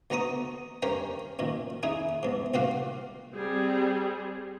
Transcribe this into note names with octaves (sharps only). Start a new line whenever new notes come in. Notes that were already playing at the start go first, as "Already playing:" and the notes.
D2 B3 A#5 C#6 D#6
G2 C#4 A#4 C#5 G5
F#2 A#2 D#3
C#4 D#4 E4 G#4
E2 G#2
C2 G2 A#2 F#4 G4 F5
G3 C4 G#4